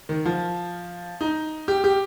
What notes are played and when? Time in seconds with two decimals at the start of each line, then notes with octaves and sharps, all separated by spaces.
0.09 D#3
0.25 F3
1.21 D#4
1.68 G4
1.84 G4